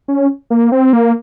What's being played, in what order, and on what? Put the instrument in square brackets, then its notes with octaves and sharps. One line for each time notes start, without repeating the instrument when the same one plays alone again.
[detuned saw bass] C#4
A#3
C4
A#3